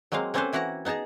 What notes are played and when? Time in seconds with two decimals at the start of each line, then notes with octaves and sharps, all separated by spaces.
0.12 F#3 G#3 A#3 C4 F5
0.34 A#3 C4 C#4 A4 B4 C5
0.53 E3 E4 F#4 F#5 A#5
0.85 B3 D#4 G#4 A5 A#5